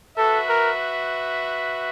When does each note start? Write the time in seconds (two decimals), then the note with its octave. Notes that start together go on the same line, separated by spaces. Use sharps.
0.18 F#4 A4 B4 E5
0.49 A#4